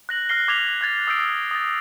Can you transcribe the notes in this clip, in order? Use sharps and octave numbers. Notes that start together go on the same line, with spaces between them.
F#6 A#6 F#7
F6 F#6 A#6 C7 G7
D6 G#6 B6 F7 G7
F#6 G#6 A6 F7
D#6 E6 F#6 G6 C7 D7
D#6 A6